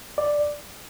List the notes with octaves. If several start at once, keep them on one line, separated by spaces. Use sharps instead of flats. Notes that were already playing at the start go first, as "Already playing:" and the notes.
D5